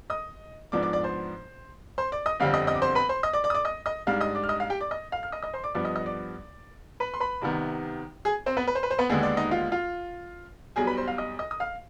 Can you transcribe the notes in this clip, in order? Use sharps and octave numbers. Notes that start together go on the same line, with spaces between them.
D#5 D#6
G#2 F3 B3 D4 D5 D6
D5 D6
D5 D6
C5 C6
C5 C6
D5 D6
D#5 D#6
G1 F2 D3 G3 C4 F5 F6
D#5 D#6
D#5 D#6
D6
C5 C6
B4 B5
C5 C6
D#5 D#6
D5 D6
D5 D6
D#6
D5 D6
D#5 D#6
D#5 D#6
G#2 G3 D4 F5 F6
D#5 D#6
D5 D6
F6
D#5 D#6
F5 F6
G4 G5
D5 D6
D#5 D#6
F5 F6
F6
D#5 D#6
D#5 D#6
C5 C6
D5 D6
G2 F3 B3 D4 D5 D6
D#5 D#6
D#5 D#6
D5 D6
B4 B5
C6
B4 B5
C2 C3 D#3 B3
G#4 G#5
C4 C5
B3 B4
B4
C5
B4
C5
B3 B4
D#2 D3 G#3 B3 G#4
D4 D5
D#4 D#5
F4 F5
F4 F5
B1 B2 G3 G#4 G#5
B4 B5
C5 C6
F5 F6
D#5 D#6
D#5 D#6
D#6
F5 F6